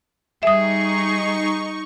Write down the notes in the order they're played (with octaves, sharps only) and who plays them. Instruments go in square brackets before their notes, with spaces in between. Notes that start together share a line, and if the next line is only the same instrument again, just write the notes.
[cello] G3 G#4 [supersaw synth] D#4 C#6 [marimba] E5 D#6